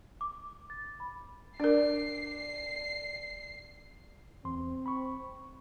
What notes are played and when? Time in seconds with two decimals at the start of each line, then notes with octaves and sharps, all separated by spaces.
0.21 D6
0.70 A6
1.00 B5
1.60 D4 A#4 D5 C7
4.45 E2 C4 C6
4.86 B5 C#6